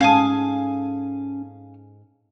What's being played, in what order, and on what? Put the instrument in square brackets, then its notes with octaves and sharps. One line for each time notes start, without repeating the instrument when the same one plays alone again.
[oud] G#2 G#4 A4 [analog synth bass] C#4 [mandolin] F5 G#5 D#6